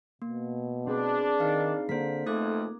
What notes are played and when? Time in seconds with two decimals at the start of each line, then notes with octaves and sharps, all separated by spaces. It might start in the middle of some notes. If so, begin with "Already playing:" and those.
0.22 B2 A#3
0.87 C4 D4 G#4 B4
1.40 D#3 D#4 F5
1.89 D3 A#3 C5 B6
2.26 F2 B2 A3 D#4 D6 D#6 F#6 G#6